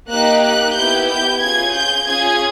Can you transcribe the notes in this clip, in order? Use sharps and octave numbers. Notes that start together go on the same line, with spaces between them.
A#3 D#4 G4 F#6
F#6
B3 E4 G4 G6
G6
C#4 F4 G#4 G#6
G6
C#4 F4 G#4 G#6